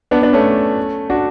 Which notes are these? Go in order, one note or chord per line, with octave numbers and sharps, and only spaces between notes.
B3 D4
B3 D4
A3 C#4
D4 F#4